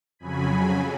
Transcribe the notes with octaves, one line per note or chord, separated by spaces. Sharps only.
F2 C#3 F#3 G#5 B5